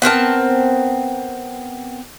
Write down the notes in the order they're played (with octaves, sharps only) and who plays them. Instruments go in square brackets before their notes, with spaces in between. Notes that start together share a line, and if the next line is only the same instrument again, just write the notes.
[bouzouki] B3 C4 A#4 A5